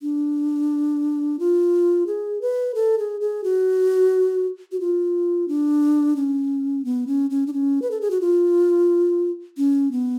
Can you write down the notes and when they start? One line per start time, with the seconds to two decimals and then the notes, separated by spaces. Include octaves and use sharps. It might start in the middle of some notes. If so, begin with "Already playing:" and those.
0.02 D4
1.39 F4
2.07 G#4
2.41 B4
2.75 A4
2.99 G#4
3.21 G#4
3.44 F#4
4.72 F#4
4.80 F4
5.48 D4
6.16 C#4
6.85 B3
7.07 C#4
7.30 C#4
7.47 D4
7.53 C#4
7.82 B4
7.91 A4
8.01 G#4
8.11 F#4
8.21 F4
9.57 C#4
9.92 B3